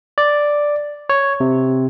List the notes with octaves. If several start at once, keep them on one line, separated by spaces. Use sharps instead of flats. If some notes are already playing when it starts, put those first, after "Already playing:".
D5
C#5
C3